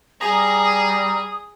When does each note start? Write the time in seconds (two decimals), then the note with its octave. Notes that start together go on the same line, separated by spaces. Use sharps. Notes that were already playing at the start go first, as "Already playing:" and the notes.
0.21 G3 G#4 A#5 D#6
0.86 D#6